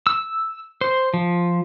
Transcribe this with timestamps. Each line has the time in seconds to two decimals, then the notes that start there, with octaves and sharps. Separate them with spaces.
0.07 E6
0.81 C5
1.14 F3